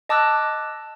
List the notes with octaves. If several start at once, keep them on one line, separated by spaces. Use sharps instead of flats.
D#5 A5 D6 E6 F#6